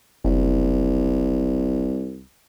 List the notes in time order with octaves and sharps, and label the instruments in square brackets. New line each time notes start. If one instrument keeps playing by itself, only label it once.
[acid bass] F#1 [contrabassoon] C2